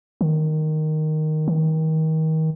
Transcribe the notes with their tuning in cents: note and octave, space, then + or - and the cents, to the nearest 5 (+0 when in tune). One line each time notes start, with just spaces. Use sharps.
D#3 -5
D#3 +30